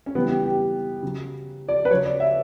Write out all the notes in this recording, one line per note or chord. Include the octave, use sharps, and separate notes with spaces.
C#4
C#3 E3 G3 B3
G4
G4
C#3 F#3
D5
B4
C#3 F#3 C#5
D5
E5